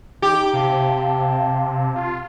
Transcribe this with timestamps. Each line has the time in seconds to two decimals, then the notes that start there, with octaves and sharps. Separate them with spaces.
0.22 D#4 G4
0.53 C3 F5 A5
1.96 F4